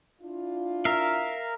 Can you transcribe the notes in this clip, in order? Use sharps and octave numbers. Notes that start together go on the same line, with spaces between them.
D4 E4 F4
A#4 E5 F5